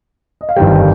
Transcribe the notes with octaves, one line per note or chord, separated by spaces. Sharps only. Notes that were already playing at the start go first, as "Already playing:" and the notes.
D#5
F5
G1 F2 D#3 G3 G5